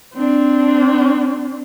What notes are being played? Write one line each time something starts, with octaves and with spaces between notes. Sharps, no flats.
C4 D4